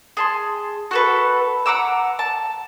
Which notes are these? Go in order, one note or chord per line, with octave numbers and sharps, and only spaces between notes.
G#4 A5 C6
F#4 A4 B4
F#5 A#5 D6 E6
A5